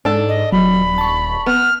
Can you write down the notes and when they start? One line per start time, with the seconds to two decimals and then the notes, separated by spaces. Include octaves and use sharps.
0.05 G#2 D4 A4
0.28 D#5
0.52 D#1 F#3 B5
0.98 A5 C#6
1.46 B3 F6